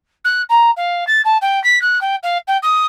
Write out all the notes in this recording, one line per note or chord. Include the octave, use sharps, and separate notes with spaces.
F#6
A#5
F5
A6
A5
G5
B6
F#6
G5
F5
G5
D#6